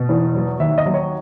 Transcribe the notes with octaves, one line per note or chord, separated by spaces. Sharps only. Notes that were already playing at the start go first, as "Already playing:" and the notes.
Already playing: B2
E2
F#3
D#2 E5
D#5
F#3
C#5